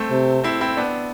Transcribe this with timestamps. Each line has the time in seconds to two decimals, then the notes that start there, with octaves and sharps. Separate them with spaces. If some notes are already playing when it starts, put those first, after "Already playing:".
Already playing: A3 C4
0.10 C3
0.44 C4 E4
0.61 C4 E4
0.77 B3 D4